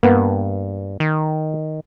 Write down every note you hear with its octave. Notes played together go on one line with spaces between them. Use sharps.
G2 A#3 B3
D#3